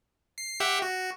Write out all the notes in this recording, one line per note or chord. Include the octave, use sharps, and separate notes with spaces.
C7
G4 E5 F#5
F#4